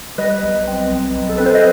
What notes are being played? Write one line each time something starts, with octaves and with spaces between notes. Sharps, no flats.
G3 B4 D#5
B1
C4
B1
B1
A4
C4 B4
C5
D#5